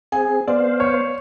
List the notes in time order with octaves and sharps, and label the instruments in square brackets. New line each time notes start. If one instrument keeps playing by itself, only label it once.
[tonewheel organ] C4 G#4 [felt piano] G#5
[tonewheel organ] B3 C5 F5 [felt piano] D5
[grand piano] C#5